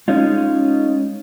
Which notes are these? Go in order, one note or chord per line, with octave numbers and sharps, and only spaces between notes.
G#3 C#4 D#4 F4